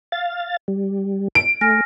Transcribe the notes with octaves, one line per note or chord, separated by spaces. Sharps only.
F5 A6
G3
D7
A3 G#5 F6 A#6